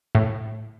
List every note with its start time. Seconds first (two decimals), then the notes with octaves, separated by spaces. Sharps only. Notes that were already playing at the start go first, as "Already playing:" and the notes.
0.15 A2